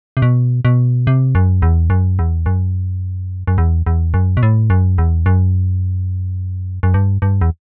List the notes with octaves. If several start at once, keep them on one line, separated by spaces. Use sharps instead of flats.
C3
B2
B2
C3
F#2
E2
F#2
E2
F#2
F#2
E2
E2
F#2
B2
A2
F#2
E2
F#2
F#2
G2
G2
E2